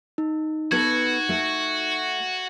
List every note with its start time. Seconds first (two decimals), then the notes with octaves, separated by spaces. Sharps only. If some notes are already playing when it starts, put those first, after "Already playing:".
0.18 D#4
0.72 B3 F#4 A4 G#6
1.29 A3